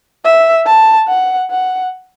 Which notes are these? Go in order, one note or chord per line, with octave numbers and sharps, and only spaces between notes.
E5
A5
F#5
F#5